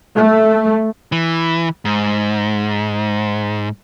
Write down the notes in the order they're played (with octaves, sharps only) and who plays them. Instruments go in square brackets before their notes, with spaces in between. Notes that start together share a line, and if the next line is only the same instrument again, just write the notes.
[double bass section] A3
[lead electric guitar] E3
G#2